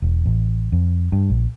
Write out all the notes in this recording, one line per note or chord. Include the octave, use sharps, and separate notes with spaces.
E1
A1
F2
G2
A#1